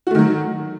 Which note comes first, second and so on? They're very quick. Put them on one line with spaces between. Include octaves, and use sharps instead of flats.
F#4 A3 D#3 F#3